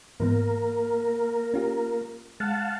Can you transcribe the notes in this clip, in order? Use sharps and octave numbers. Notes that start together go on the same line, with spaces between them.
G#2 E3 A#3 B3 A#4
C#4 F4 G4
G#3 F5 F#5 A5